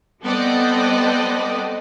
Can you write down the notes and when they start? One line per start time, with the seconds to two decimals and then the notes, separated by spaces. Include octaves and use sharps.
0.23 G3 B3 C4 A4 D5 D#5